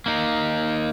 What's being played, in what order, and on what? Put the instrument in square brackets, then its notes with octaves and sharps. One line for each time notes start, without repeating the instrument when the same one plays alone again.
[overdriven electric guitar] A#3 D#4